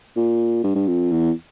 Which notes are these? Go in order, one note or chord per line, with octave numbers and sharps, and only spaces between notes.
A#2
G2
G2
F2
E2